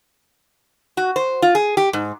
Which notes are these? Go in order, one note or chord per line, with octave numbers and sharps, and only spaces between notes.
F#4
C5
F4
G#4
G4
G#2